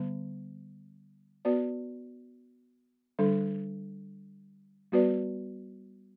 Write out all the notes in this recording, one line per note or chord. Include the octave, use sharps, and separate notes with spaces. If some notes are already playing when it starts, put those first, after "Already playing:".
Already playing: D3 G3 B3
B3 F#4 B4 D5
D3 G3 D4 A4
G3 B3 F#4 B4 D5